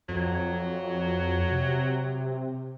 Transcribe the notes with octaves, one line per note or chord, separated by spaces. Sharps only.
F2 F#3
C3